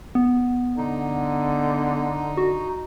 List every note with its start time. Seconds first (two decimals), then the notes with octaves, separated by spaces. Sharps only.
0.15 B3
0.77 D3 D#4
2.37 F#4